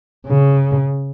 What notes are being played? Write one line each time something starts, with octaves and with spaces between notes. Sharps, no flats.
C#3